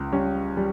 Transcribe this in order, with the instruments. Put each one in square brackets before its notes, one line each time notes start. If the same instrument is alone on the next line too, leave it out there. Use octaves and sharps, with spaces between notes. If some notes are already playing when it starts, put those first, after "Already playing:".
Already playing: [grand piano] C#2
G3 C#4
G3